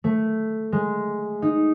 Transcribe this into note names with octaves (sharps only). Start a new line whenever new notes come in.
A3
G#3
D#4